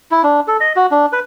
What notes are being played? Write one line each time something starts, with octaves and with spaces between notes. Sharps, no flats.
E4
D4
A4
D#5
F#4
D4
B4